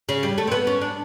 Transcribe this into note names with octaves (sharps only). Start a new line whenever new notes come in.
C#3
G3
A3
C4
B3
C#4
D4